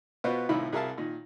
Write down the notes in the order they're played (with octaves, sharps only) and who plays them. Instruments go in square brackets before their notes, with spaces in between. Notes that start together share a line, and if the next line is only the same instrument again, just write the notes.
[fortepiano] B2 B3 F4 C5
C2 A2 D#3 E4 F4 B5
C2 G#4 A#4 E5 F5 A5
A#2 D#3